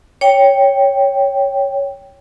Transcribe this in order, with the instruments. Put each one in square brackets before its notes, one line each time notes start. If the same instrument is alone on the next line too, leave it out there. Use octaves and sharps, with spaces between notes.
[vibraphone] C#5 G5